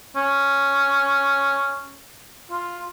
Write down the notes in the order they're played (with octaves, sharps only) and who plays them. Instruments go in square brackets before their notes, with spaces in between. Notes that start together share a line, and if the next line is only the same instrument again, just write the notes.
[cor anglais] C#4
F4